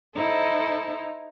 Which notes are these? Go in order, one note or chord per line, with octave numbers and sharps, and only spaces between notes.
D#4 E4 A4 C5